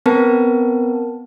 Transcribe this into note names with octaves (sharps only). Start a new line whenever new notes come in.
B3 C4 A#4 B4 A5